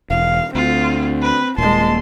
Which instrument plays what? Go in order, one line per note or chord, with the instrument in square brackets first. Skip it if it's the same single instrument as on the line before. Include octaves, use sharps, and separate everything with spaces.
[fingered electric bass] E1 [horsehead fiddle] F5
[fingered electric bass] D2 [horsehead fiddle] C4 [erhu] F4
[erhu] B4
[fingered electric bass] D#1 A#2 [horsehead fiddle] G#3 A5 [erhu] C6